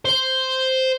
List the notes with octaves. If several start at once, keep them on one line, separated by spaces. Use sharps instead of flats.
C5